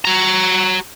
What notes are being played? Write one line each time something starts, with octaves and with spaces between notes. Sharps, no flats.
F#4 A#5